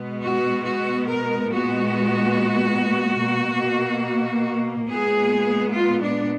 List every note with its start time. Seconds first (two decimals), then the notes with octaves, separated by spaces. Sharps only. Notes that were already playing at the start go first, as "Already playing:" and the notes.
Already playing: B2 G#3 B3
0.22 F#4
0.64 F#4
1.07 A#4
1.49 A#2 G#3 B3 F#4
3.19 B2 A#3
4.88 A#2 G#3 B3 G#4
5.73 F4
6.01 D4